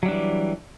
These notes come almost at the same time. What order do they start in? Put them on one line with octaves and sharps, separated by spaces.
F#3 G3 D4 E3